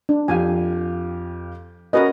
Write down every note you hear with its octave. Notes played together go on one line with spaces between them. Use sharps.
D4
F2 G4 F5 G#5
C#4 F#4 A#4 B4 D#5